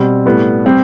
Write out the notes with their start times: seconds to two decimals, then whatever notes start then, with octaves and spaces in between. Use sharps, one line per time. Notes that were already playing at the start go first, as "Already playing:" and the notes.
Already playing: B2 G3 C4
0.25 A2 G3 B3
0.65 G3 C4 G4